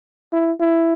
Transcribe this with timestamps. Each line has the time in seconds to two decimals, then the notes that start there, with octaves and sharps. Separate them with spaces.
0.32 E4
0.60 E4